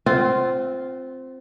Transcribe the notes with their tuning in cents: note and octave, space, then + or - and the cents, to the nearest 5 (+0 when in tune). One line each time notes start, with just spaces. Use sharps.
C4 +0 F4 +0 F#5 +40